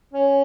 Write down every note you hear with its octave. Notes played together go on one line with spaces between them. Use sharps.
C#4